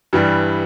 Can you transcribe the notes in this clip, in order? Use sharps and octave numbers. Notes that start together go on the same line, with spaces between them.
G2 E3 G3